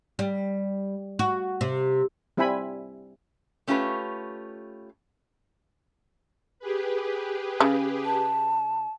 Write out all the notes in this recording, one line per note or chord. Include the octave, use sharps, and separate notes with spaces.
G3
F#4
C3
G3 C4 E4 E5 G#5 B5
A3 C#4 F4 G4 B4
G4 G#4 B4
C#3
A5